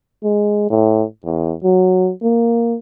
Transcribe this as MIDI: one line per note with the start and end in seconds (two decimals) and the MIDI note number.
0.24 0.69 56
0.70 1.03 45
1.25 1.55 40
1.64 2.11 54
2.22 2.77 58